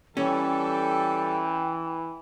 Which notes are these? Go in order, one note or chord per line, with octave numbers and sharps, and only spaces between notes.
E3 G3 C#4 A4 G5